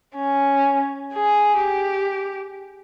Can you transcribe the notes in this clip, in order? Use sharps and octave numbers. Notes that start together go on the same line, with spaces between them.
C#4
G#4
G4